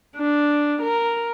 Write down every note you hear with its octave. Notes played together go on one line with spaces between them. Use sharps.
D4
A#4